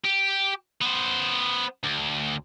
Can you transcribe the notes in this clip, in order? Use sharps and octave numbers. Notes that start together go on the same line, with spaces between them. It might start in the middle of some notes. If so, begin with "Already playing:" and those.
G4
B3 C5
D2